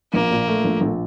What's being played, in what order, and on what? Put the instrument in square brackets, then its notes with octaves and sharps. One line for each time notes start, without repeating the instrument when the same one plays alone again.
[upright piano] A#1 [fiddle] A#3
[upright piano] A#2
A3
A#1
A#1